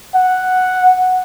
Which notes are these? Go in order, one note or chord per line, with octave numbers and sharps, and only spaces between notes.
F#5